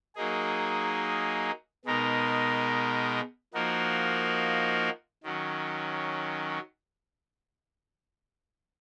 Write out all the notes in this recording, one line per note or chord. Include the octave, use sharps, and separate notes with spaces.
F#3 A#3 D#4 G#4
B2 G#3 D#4 A#4
F3 A#3 D#4 F#4 A#4
D#3 F#3 C#4